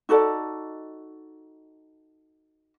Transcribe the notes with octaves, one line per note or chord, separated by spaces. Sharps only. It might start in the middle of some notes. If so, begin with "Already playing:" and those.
D#4 F#4 A4 D5